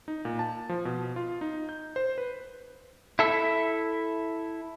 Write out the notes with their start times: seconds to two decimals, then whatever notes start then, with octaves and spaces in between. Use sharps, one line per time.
0.08 D#4
0.25 A#2
0.39 A5
0.69 F3
0.85 B2
1.16 F4
1.41 D#4
1.69 G6
1.96 C5
2.18 B4
3.19 E4 A4 E5